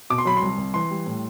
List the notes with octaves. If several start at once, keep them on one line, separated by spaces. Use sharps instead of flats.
B2 D6
C6
F#3 B5
C6
C2
C2
E3 C6
G3
A2